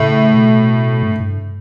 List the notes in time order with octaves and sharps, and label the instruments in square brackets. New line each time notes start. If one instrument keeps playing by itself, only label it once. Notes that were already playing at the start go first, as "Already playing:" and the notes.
Already playing: [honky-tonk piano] A2 [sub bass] C#3
[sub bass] B2
G2
G2